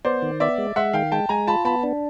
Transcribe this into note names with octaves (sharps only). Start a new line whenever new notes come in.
B3 C5 D5
D#3
B3 D5 E5
G#3
G#3 E5 F#5
D#3 F5 G5
G#3 G5 A5
G#3 G#5 A#5
F4 A5 B5
B3 A5 B5
D4